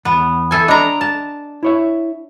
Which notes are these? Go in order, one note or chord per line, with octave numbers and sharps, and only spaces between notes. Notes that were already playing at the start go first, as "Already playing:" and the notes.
E2 B3
E3 A4 G#5
D4 D#5 A#5 B5
A5
E4 C#5 E5